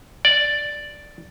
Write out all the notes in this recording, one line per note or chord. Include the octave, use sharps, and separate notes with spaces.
D5